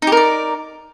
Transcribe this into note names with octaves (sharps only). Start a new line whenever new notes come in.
D#4 G4 A#4 D5